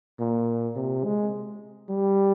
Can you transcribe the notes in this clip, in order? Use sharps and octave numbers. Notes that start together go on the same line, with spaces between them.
A#2
C3
G#3
G3